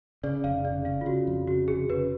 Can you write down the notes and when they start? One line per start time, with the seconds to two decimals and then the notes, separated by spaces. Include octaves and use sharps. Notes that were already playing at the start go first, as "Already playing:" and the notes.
0.24 C#3 D5
0.44 F1 F5
0.65 C#3 D5
0.85 C#3 F5
1.01 F4
1.06 C#3 F#4
1.27 F2
1.47 C#3 F#4
1.68 F1 G#4
1.89 C#3 B4